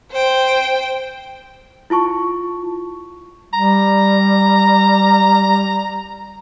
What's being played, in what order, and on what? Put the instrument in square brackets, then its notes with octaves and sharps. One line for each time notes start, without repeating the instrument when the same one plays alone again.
[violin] C5 G5
[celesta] E4 F4 A5 C#6
[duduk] G3 [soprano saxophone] A#5